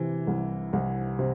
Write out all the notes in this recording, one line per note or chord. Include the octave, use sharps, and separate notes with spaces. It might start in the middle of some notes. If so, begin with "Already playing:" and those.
Already playing: C3 E3
C2
C2
C3